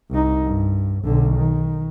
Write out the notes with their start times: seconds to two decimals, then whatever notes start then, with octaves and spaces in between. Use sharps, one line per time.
0.10 C2 D#4
0.45 G2
1.04 B1 D3
1.36 D#3